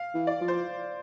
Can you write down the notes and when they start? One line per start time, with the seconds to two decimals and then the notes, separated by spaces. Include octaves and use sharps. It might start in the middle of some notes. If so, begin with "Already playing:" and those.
Already playing: F5
0.14 E3
0.27 D5
0.41 F3
0.48 C5